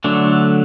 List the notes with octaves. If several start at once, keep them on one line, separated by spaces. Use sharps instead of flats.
D3 F#3 A3 D4